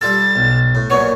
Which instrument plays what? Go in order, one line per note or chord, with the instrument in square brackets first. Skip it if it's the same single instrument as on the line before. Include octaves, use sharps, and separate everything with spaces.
[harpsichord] G3 F4 A4 [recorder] A6
[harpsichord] B1
A2
[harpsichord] F#2 A#2 B3 [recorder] C#5